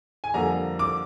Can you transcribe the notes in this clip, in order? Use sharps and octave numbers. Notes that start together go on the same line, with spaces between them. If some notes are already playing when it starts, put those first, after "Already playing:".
G#5
F2 D3 G3 A#3 A#5
D6